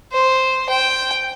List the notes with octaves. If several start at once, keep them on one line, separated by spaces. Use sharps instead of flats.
C5
G5